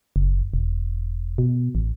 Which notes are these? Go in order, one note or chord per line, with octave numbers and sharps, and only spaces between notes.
F#1
E1
B2
A1